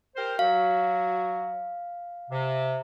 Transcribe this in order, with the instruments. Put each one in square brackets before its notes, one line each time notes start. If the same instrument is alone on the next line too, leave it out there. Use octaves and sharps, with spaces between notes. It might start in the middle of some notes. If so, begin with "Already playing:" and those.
[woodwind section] G4 A#4 C5
[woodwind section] F#3 F#4 [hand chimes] F5
[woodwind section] C3